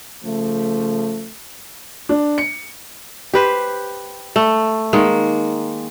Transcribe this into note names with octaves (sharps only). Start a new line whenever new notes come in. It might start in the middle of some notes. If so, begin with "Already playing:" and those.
C#3 F3 A3
D4
C#7
G4 B4 C5
A3
D#3 G#3 A#3